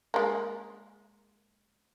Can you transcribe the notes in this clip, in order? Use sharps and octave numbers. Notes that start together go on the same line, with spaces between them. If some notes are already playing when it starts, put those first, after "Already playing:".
G#3 A#3